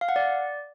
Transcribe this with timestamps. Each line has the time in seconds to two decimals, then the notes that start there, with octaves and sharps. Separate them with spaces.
0.01 F5
0.09 F#5
0.16 D5